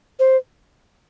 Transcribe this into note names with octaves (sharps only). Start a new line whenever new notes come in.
C5